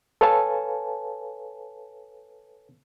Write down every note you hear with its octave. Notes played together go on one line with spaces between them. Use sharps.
A4 B4 C#5 F5 G#5 A5